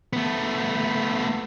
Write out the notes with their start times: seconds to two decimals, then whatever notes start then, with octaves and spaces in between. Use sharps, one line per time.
0.13 A3 B3